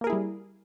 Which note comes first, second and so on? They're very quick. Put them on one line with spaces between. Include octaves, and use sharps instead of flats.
A#3 A#4 G#4 E4 G3